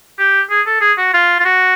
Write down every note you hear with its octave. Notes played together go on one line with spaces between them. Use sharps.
G4
G#4
A4
G#4
F#4
F4
F4
F#4